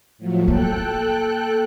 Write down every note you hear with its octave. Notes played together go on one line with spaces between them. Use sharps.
A2 F3 F#3
A#3 A4 G5 F#6